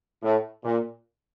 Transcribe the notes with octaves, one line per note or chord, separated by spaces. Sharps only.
A2
A#2